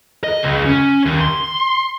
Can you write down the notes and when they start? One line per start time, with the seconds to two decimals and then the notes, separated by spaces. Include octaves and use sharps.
0.24 D#5
0.43 C#2
0.66 C#4
1.06 D#2
1.21 C6